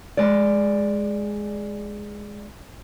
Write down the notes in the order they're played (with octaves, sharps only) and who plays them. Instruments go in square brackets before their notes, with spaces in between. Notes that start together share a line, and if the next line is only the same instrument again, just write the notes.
[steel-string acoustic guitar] G#3 D5